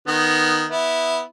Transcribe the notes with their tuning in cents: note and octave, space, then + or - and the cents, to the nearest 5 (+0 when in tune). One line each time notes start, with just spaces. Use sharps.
D#3 +0 B3 +0
B3 +0 E4 -10